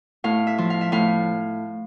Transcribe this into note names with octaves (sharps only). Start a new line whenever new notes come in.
A2 F5
E5
F3
F5
E5
A2 F5